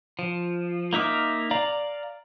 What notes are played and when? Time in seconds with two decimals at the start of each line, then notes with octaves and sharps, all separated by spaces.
0.19 F3
0.93 A#3 D#4 E5 D6 F6
1.51 D5 F5 A#5